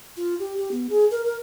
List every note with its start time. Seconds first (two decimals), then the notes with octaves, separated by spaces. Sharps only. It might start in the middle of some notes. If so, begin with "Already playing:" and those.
0.17 F4
0.39 G4
0.57 G4
0.71 B3
0.89 G#4
1.11 A#4
1.24 A#4